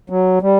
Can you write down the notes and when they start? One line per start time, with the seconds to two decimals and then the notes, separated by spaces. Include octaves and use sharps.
0.10 F#3
0.42 G3